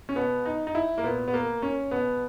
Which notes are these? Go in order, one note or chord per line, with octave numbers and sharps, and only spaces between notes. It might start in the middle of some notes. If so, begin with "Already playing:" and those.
C#4
B2 B3
D#4
D#4
E4
A#3
A#2 B3
B3
A#3
C#4
B2 B3